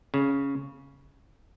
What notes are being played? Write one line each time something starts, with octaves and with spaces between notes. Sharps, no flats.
C#3